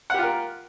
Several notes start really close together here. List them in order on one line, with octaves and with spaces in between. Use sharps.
F#5 G4 F4 A#4